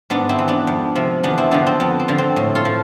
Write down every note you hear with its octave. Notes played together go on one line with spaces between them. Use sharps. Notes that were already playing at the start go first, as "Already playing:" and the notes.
G#2 B3 D4
C4 E4
E3
B3 D4
F2
C3 F3
E2 B3 D4
C4 E4
D3 F3 B3 D4
C4
F2 B3
C4
D3 F3
C4
A2
F4 A4
F3